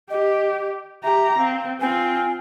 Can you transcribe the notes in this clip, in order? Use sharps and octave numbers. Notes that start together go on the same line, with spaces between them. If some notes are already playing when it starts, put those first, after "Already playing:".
G4 D#5
G4 E5 A#5
C4 F5
C4 F4 G#5